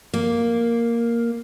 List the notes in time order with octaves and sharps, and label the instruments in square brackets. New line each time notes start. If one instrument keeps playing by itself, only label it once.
[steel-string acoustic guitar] A#3